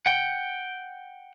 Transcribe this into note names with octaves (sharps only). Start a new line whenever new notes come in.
F#5 G5